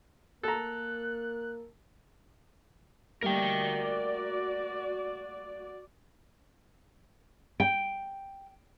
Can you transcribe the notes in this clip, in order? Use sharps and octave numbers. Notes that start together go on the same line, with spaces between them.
A#3 A4 A#4 A#5 F#6
G3 A3 A#3 F#4 A#4 D5 G5
G5